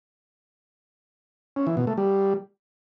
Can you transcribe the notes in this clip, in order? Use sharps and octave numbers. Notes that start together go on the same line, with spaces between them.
C#4
E3
B2
A3
G3